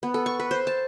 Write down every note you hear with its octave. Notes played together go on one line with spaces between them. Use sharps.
B3
A4
C#6
B4
C5
A5